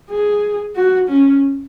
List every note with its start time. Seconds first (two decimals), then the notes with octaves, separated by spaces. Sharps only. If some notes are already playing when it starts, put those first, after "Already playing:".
0.10 G#4
0.76 F#4
1.08 C#4